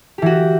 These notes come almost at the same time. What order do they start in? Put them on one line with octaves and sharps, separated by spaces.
G4 E3 F#4